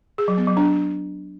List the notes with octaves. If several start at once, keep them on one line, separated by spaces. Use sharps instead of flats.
G#4
F#3
B3
F#3
D4